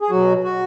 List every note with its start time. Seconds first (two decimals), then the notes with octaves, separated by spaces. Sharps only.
0.01 G#4
0.10 B2 F#3 F#4
0.44 F#4